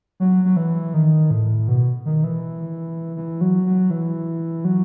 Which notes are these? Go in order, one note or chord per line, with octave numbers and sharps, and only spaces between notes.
F#3
F#3
E3
D#3
A2
B2
D#3
E3
E3
F#3
F#3
E3
F#3